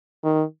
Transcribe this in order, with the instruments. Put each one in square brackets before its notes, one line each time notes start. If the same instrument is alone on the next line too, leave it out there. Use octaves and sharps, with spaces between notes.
[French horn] D#3